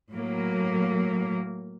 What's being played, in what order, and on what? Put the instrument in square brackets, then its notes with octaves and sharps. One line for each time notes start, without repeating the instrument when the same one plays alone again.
[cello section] A2 F#3 A#3